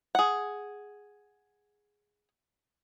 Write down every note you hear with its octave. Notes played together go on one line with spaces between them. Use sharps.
G#4 F#5